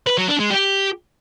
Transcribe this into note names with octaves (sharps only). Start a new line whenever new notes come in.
B4
F#3
D4
G#3
G4